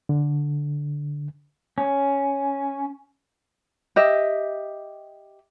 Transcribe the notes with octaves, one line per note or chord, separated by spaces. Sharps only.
D3
C#4
G4 D#5 E5